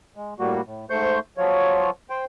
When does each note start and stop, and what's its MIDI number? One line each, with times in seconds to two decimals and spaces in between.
0.16 0.34 56
0.39 0.61 45
0.39 0.61 55
0.39 0.61 58
0.39 0.61 66
0.66 0.85 45
0.90 1.19 44
0.90 1.19 57
0.90 1.19 72
0.90 1.19 84
0.90 1.19 85
0.90 1.19 91
1.37 1.90 53
1.37 1.90 54
1.37 1.90 65
1.37 1.90 73
2.10 2.25 72
2.10 2.25 79